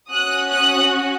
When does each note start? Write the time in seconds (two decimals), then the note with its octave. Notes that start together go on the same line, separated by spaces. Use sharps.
0.11 C#4 F#4 D#6 F#6
0.50 D#6 F#6